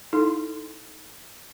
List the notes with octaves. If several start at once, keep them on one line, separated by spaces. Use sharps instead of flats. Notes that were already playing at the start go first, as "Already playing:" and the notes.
D#4 E4 A4